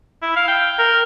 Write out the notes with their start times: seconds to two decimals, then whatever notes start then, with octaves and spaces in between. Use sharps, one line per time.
0.22 E4
0.36 F5
0.48 G5
0.79 A#4